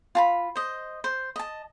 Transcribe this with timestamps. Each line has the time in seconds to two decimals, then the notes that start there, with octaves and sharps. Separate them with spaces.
0.15 F4 A5 B5
0.56 C5 D#5
1.04 C5
1.36 D#5 A5